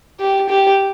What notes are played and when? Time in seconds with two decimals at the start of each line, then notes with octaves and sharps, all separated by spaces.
0.20 G4
0.49 G4